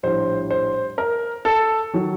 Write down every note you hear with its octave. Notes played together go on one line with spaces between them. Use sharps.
A#1 A2 G3 C5
C5
A#4
A4
D#3 F#3